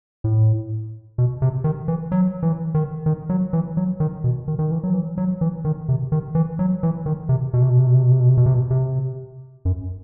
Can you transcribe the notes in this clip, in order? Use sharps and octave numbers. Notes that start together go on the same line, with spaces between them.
A2
B2
C3
D#3
E3
F#3
E3
D#3
D#3
F#3
E3
F#3
D#3
B2
D#3
D#3
E3
F#3
E3
F#3
E3
D#3
C3
D#3
E3
F#3
E3
D#3
C3
B2
C3
B2
C3
B2
C3
B2
C3
B2
C3
B2
C3
B2
C3
F#2